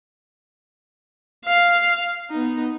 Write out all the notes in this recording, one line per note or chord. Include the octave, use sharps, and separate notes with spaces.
F5
B3 D#4